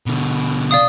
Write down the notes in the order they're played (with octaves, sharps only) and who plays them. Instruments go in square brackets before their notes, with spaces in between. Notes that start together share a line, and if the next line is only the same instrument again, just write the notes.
[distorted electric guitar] B2 D3
[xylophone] D5 F5 D#6